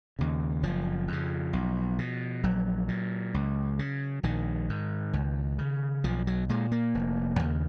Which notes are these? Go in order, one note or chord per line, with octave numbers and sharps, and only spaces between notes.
D#2 C#3
F#1 F3
F2 C#3
B1
B2
A#1 F#3
A#2
C#2
C#3
A#1 D#3
G#2
C#2
C#3
B1 F3
F#3
A#2 G#3
A#3
F1
D#2 C#3